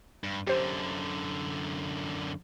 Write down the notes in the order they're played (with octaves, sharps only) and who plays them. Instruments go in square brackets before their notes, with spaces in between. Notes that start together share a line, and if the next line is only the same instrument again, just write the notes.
[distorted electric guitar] G2
[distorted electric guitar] F#2 D3 [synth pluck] G4 C5